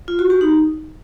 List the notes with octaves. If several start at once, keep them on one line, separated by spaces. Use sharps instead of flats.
F4
F#4
G4
D#4